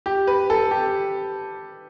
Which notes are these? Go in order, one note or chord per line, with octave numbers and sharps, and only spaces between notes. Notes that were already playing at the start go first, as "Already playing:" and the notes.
G4
B4
A4
G4